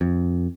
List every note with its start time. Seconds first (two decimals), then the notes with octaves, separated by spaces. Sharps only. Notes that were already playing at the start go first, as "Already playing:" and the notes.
0.01 F2